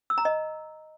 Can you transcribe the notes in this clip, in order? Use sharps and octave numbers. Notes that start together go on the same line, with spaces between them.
E6
A#5
D#5